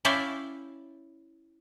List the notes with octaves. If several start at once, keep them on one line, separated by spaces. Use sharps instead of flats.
C#4 E4 D5 E5 F5 G5